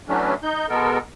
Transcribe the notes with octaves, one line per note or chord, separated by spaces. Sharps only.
E3 F#3 A3 C#4 D4
D#4 G6
B2 G#3 B3 A4 A#4